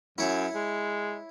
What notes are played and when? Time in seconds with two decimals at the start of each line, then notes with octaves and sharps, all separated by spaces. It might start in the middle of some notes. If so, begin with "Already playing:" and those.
0.18 F#2 E4 C#5
0.55 G#3